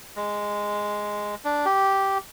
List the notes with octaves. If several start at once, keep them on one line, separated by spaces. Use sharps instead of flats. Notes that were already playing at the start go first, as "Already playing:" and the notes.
G#3
D4
G4